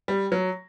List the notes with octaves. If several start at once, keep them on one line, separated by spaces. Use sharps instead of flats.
G3
F#3